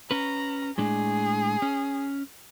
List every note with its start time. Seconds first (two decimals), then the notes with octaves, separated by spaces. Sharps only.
0.11 C#4 B4 A#5
0.78 A2 G#3 D4 G#4
1.62 C#4